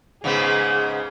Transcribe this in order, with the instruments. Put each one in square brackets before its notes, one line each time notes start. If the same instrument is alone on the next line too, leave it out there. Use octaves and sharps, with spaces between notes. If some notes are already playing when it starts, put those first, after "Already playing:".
[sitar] G#2 C#3 B3 [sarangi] G#4